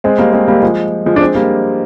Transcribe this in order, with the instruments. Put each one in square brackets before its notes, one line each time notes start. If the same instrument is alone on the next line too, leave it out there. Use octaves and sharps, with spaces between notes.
[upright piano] G#3 C4
G3 A#3
G#3 C4
G3 A#3
F3 G#3
F3 G#3
D4
G#3 C4
G3 A#3